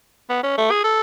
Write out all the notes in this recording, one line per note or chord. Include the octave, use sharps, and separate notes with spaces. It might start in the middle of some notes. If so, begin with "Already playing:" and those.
B3
C#4
A3
G#4
A4